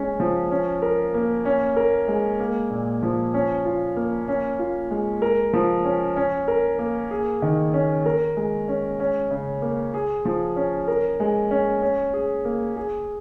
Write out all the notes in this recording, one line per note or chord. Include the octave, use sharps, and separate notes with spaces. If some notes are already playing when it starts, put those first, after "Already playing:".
Already playing: G#3 C#4
F3
C#4
A#4
A#3
C#4
A#4
G#3
A#3
A#2
F3
C#4
F4
A#3
C#4
F4
G#3
A#4
F3
C#4
C#4
A#4
A#3
G#4
D#3
C#4
A#4
G#3
C#4
C#4
C#3
A#3
G#4
F3
C#4
A#4
G#3
C#4
C#4
G#4
A#3
G#4